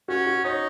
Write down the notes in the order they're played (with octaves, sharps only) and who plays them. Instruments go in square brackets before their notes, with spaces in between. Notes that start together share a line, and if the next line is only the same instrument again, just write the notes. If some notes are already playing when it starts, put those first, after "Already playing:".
[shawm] C#4 [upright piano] F#4
[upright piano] F#4
[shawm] D#4 [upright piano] C#5